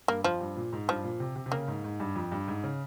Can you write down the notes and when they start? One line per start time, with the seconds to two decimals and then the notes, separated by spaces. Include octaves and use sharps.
0.08 G2 A#3
0.24 F2 F3
0.40 G2
0.56 A#2
0.73 G#2
0.88 G2 F3
1.04 A#2
1.20 C3
1.36 C3
1.46 C3
1.52 C#3 A#3
1.68 G#2
1.84 G#2
2.00 G2
2.16 F2
2.32 G2
2.48 G#2
2.64 C#3